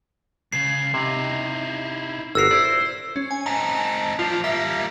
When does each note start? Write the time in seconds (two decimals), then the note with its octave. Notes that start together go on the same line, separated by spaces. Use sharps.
0.52 C#2 C#3 C7
0.94 C3 D#4 E4
2.35 G1 F#4 A#4 E6 C7
2.51 E4 C5 D5
3.16 C#4
3.31 G#5
3.46 C4 D#4 A5
4.19 F3 D4 F4
4.44 G3 A#3 E5 B6